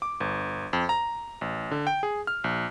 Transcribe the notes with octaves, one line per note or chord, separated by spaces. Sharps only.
D6
G1
F2
A#5
A1
D3
G5
G#4
F6
A#1